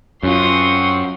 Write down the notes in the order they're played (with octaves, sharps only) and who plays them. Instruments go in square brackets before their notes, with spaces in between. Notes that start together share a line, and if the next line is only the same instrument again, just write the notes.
[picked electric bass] F#2 [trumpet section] C4 F#4 C#6 [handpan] C#4 F4 [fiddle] C6 D#6